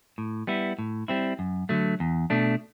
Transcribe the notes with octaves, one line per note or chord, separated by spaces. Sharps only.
A2
G3 B3 E4
A2
G3 C4 E4
F#2
D3 F#3 A3
E2
B2 A3 D4